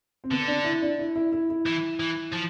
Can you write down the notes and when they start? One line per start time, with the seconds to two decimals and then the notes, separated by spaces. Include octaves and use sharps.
0.24 C4
0.31 D3 B3
0.48 D4
0.64 E4
0.82 D4
0.99 E4
1.16 E4
1.32 E4
1.50 E4
1.66 E3
2.00 E3
2.33 F3